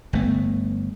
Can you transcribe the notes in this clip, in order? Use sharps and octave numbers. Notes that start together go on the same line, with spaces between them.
G1 A3 B3